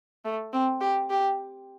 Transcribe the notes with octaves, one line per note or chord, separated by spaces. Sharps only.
A3
C4
G4
G4